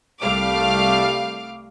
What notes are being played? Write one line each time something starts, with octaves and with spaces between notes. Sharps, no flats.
C2 G3 A3 F5 D6 F6